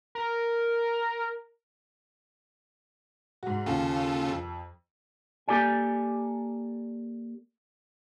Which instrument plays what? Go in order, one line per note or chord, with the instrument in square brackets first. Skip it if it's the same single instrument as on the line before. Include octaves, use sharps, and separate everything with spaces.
[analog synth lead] A#4
[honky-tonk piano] G#2 F#4
[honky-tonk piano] D#2 [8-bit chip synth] C#3 F4 A4
[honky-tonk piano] F2
[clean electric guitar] A#3 G4 A4 D5 G#5